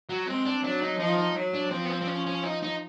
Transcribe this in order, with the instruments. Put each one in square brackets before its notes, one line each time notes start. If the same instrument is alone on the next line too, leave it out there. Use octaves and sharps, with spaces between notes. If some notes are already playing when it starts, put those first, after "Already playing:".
[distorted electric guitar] F#3
[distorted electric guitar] G#3 [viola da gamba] C4
[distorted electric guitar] D4
[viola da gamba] F#3 [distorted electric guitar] D4
[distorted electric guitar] D#4
[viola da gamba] F3 [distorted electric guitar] D#4
[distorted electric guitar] D#4
[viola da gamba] F#3
[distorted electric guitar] D4
[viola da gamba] F3 [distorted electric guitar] C4
[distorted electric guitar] B3
C4
C4
C#4
C#4
D#4
D#4